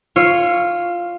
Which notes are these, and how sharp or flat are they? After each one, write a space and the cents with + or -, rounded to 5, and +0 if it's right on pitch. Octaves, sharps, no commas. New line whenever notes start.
F4 +0 C#5 +0 E6 +45